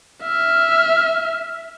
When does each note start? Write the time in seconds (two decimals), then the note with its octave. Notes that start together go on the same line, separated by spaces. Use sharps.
0.23 E5 F6